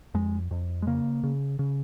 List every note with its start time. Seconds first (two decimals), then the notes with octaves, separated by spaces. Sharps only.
0.14 F2 G#3
0.51 F2
0.82 G#3
0.87 C#3 A#3
1.23 C#3
1.59 C#3